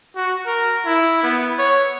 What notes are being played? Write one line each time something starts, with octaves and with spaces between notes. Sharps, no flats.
F#4
A#4
E4
B3
C#5